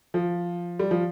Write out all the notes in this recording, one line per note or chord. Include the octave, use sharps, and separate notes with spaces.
F3
G3
F3